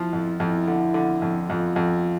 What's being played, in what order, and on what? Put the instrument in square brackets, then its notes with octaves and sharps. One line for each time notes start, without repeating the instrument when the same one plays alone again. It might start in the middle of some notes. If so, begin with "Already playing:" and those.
Already playing: [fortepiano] F3 [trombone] E4
[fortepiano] F2
[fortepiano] F2 [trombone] E4
[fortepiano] D3
D3
F2
[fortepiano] F2 [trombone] F4
[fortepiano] F2